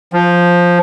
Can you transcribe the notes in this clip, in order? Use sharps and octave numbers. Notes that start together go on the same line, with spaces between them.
F3